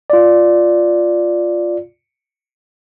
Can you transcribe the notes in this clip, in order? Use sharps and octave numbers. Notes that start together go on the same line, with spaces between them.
F4 D5